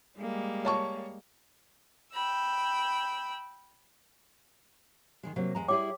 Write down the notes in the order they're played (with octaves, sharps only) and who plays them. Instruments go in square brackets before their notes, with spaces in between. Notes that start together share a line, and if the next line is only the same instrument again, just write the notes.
[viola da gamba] G3 G#3 A#3
[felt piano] C#5 A5 C#6
[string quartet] G5 B5 E6
[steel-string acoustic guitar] D#3 F3 G#3
C3 F#3 A#3
E2 G#3 A#5
[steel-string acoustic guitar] G3 E4 G#4 [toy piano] C#5 G5 D6